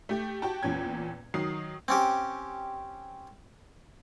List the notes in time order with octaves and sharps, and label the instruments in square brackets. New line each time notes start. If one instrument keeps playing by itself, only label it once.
[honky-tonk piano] A3 G4
F#4 G4 G5 A5
E2 A#2 C#4 G5 G#6
D#3 F#3 D#6 C7
[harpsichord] C4 C#4 G4